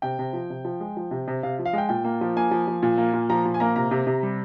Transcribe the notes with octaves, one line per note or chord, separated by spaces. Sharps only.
C3 G5
C3
F3
C3
F3
G#3
F3
C3
C3
C3 F5
F3
F5
G#3 G5
A#2 G5
A#3
F3
A#3 G#5
F3
F3
A#2
A#3
A#2
F3 A#5
A#2
G#5
A#3 A#5
C3 A#5
C3
C3
G3